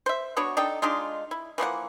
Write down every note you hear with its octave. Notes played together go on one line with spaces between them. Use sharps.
C5 E5
B3 D4 F#4 C#5
D4 D#4 A4 G5
G#3 D4 D#4 F4
E4
E3 F3 A#3 F#5